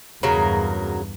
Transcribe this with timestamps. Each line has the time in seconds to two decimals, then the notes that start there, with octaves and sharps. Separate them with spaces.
0.23 E2 G2 C#3 F#3 A#4